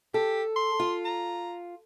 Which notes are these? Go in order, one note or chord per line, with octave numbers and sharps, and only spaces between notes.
G4 A4
C6
F4
A#5